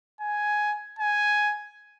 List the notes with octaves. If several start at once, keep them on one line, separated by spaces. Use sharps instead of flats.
G#5
G#5